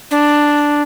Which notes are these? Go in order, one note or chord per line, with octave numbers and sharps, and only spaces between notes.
D4